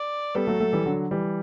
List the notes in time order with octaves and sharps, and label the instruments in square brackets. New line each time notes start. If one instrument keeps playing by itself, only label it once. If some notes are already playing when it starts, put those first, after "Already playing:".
Already playing: [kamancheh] D5
[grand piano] G3 B3 [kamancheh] A4
[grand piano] F#3 A3
F#3 A3
E3 G3
D3 F#3
E3 G3